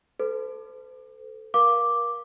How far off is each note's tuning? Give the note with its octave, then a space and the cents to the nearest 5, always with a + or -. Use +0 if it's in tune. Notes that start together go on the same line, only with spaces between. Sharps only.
A4 +0 C5 -45
A#4 +30 F5 +0 D6 +0